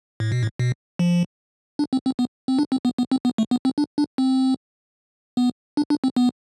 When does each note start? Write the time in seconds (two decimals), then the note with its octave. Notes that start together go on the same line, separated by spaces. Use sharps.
0.20 A2
0.32 B2
0.43 A2
0.59 B2
0.99 F3
1.79 D4
1.93 C4
2.06 C4
2.19 B3
2.48 C4
2.59 D4
2.72 C4
2.85 B3
2.98 B3
3.12 C4
3.25 B3
3.38 A3
3.51 B3
3.65 C4
3.78 D4
3.98 D4
4.18 C4
5.37 B3
5.77 D4
5.90 D4
6.04 C4
6.16 B3